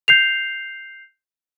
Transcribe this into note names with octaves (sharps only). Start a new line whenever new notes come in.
G6 C7 F7